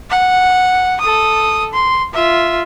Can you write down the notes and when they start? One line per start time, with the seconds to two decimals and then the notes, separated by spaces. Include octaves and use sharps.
0.11 F#5
1.01 A4 D#6
1.73 C6
2.14 F4 E5